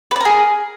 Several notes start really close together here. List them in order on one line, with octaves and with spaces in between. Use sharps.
B4 D5 A#4 G#4